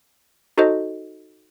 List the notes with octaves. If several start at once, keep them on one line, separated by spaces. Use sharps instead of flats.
D#4 F#4 A4 C5 D#5